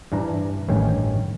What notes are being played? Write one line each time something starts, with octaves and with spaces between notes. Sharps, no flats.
G2 E3 D4 A#5
A1 G2 D#3 C#4 C#5 G5